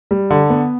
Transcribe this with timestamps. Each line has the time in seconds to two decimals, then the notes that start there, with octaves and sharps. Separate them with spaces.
0.11 G3
0.30 D3
0.50 B3